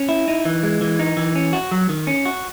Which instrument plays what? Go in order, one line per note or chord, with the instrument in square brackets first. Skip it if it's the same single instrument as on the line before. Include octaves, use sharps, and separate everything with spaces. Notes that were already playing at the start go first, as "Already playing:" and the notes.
Already playing: [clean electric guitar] C#4
E4
D#4
E3
G#3
E3
D#4
E3
C#4
F#4
F#3
D#3
C#4
F#4